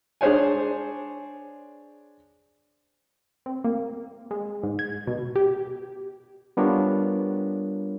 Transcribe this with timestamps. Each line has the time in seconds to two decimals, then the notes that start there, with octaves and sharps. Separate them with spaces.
0.21 D4 G#4 C5 C#5 G#5
3.46 C4
3.64 A#3
4.31 G#3
4.63 G#2
4.79 G#6
5.07 B2
5.36 G4
6.57 G3 B3 D4 F4 A#4 C#5